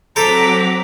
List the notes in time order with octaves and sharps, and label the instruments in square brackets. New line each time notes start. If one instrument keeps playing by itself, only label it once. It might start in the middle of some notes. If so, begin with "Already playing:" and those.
[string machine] F#3 C4 F#5 [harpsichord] A4 C5 [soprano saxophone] A#5 [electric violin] D6 B6